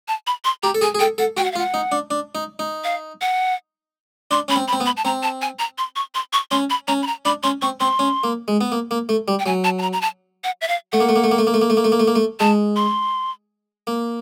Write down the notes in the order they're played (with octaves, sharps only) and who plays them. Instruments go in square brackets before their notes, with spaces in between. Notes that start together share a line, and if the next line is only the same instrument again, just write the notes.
[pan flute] A5
B5
C6
[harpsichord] G4 [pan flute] A#5
[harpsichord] A4
[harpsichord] G#4 [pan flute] G#5
[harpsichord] G#4
[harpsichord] A4 [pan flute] G5
[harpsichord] A4 [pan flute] F#5
[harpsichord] F#4 [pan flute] G5
[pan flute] F#5
F5
[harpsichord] F4
[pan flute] F#5
[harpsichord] D#4
D4
D4
D#4
D#4
[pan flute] F5
F#5
[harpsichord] D4 [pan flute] C6
[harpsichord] C#4 [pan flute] B5
[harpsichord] C4
[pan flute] B5
[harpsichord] C4
B3
[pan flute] B5
A5
[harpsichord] C4 [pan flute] A#5
[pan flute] A5
G#5
A#5
C6
C#6
C6
C#6
[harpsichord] C#4 [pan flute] C6
[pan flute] B5
[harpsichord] C#4 [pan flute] A#5
[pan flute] B5
A#5
[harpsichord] D4 [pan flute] B5
[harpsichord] C#4 [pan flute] C6
[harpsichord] C4 [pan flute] C#6
[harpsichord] C4 [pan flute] C6
[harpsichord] C#4
A#3
G#3
B3
A#3
A#3
A3
G3
[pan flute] G5
[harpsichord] F#3 [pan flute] G#5
[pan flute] A5
A5
A#5
A#5
A5
F#5
E5
F5
[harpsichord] A3 [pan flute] F#5
[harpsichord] A#3
A3
A#3
A3
A#3
A3
A#3
A3
A#3
A3
A#3
A3
A#3
A3
A#3
A3
[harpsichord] G#3 [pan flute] A5
[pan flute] C6
[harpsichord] A#3